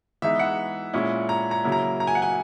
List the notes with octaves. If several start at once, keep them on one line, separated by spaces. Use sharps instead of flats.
E3 G#3 B3 D#4 E5
F#5
A#2 G#3 C#4 E4
A#5
A#5
C#3 F#3 A#3 E4
A#5
A#5
G#5
F#5
G#5